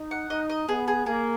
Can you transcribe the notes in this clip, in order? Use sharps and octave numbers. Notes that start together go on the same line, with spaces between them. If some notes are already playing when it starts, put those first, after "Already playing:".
Already playing: D#4
F#5
D#4 D#5
D#5
B3 G#4
G#4
A#3 G#4